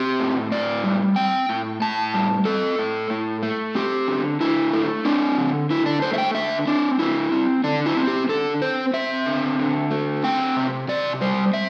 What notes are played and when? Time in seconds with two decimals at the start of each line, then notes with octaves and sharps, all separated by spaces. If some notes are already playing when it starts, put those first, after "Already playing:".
Already playing: C4 G4
0.20 A2
0.52 A2 D5
0.84 G3
1.16 C4 G5
1.49 A2
1.82 A2 A5
2.14 G3
2.45 C4 A4
2.79 A2
3.10 A2
3.43 A3
3.75 C4 G4
4.07 D3
4.41 D3 E4
4.73 A3
5.05 C4 D4
5.38 D3
5.70 D3 E4
5.86 D4
6.02 A3 C5
6.14 E5
6.18 G5
6.34 D3 E5
6.67 C4 D4
6.99 D3 E4
7.31 C4
7.64 D3 D4
7.86 E4
7.97 C4
8.07 G4
8.29 D3 A4
8.62 C4 C5
8.94 C4 E5
9.26 D3
9.59 D3
9.91 A3
10.23 C4 G5
10.57 C3
10.88 C3 D5
11.21 G3 C5
11.53 C4 E5